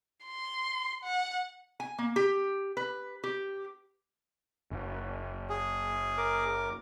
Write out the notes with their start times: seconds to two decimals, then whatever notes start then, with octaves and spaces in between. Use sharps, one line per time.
0.25 C6
1.03 F#5
1.80 G#5
1.98 A#3
2.16 G4
2.77 B4
3.24 G4
4.71 F#1
5.50 G#4
6.18 A#4 D6